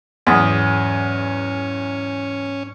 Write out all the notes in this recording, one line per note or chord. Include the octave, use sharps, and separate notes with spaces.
E2 G#2 F#3 C#4 D#6